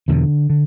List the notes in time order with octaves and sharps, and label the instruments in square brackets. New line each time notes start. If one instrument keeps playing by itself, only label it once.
[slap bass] E2 B2 D3
D3